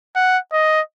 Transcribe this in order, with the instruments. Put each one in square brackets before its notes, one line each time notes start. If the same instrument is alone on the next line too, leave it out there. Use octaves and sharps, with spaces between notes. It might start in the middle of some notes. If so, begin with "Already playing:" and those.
[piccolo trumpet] F#5
D#5